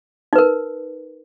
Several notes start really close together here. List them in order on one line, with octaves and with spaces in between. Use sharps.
D#4 B4 A#4